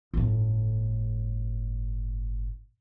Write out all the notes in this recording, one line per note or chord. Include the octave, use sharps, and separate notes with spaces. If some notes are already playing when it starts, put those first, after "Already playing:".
G1 A2